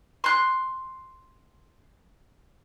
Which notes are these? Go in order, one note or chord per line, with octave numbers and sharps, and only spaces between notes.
C6 F#6